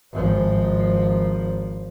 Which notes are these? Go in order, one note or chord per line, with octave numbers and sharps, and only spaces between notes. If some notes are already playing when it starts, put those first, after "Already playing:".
G#1 F3